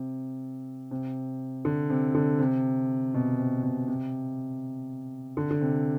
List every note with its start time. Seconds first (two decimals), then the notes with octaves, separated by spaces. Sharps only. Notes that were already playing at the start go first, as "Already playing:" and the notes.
Already playing: C3
0.91 C3
1.65 D3
1.90 C3
2.15 D3
2.39 C3
3.14 B2
3.38 C3
3.63 B2
3.88 C3
5.37 D3
5.51 D3
5.61 C3